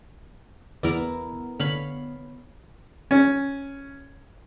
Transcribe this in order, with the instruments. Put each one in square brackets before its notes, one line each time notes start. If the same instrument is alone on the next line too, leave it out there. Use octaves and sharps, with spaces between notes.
[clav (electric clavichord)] E2 D5 [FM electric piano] B3 [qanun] E4 A#4 A#5
[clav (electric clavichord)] D3 [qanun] C#5 F5 B5
[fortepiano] C#4